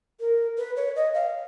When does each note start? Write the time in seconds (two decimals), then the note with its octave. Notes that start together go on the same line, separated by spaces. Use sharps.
0.20 A#4
0.57 B4
0.77 C#5
0.96 D#5
1.14 F5